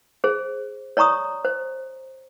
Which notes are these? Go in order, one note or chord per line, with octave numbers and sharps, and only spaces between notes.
G#4 C5
C#5 D5 A#5 C#6 D#6
C5